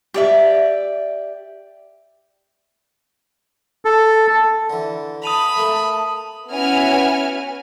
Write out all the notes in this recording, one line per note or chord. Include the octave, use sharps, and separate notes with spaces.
G4 D5 E5
A4
D3 E3
A5 B5 D#6 D#7 F7
A3 A#3
B3 C#4 E4 F#4 G#5 F6